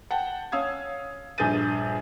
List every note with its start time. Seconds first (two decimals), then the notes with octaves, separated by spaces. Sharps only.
0.11 F#5 G5 A5
0.52 C#4 F5 D#6 E6 G#6
1.38 A#1 G2 G#4 G6 A6 D#7